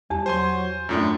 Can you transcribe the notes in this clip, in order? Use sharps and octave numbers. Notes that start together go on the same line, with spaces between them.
E2 G3 G4 A5
F#3 C5 G#5 C6
F#2 A2 D4 F4